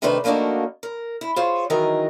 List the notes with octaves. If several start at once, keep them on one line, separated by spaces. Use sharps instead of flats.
C3 D#3 A3 D4 B4 C5
F3 A3 A#3 D4 D#4 F#4
A#4
E4
F4 G#4 C5 C#5
D#3 E3 F#3 D#4 G#4 A#4